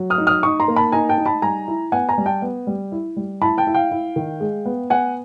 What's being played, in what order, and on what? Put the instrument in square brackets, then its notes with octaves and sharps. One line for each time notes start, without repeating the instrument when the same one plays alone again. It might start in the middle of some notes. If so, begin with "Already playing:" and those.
Already playing: [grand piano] F#3
D#6 F6
D#4
D#6 F6
D#4 C#6 D#6
A#5 C6
A#3
A5 B5
D#4 G#5 A#5
G5 A5
D#4
A5 B5
G3 G#5 A#5
E4
B3 F#5 G#5
G#5 A#5
G3
G5 A5
B3
G3
E4
G3
E4 A5 B5
G5 A5
E4
F5 G5
E4
D#3
G#3
B3
B3 F#5 G#5